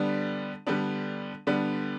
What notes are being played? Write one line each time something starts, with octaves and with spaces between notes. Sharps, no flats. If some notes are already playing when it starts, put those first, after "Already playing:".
Already playing: D3 G3 B3 D4
D3 G3 B3 D4
D3 G3 B3 D4